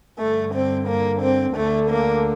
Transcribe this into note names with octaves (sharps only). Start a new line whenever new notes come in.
G2 D3 A3
C4
A#3
C4
D2 D3 A3
A#3